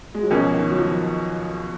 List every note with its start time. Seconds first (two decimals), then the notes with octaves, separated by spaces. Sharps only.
0.14 G#3
0.23 F#3
0.30 C#2 B2 F3 A#3 C#4
0.54 D#3
0.71 F#3
0.78 F3